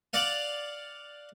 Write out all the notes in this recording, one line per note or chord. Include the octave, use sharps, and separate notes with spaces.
D5 F5 F#5